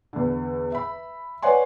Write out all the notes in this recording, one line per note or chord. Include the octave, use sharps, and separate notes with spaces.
E2 D3
E5 B5
B4 C#5 D5 F#5 G#5 C6